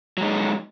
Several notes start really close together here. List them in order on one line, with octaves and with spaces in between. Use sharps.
F#3 G#3 D#4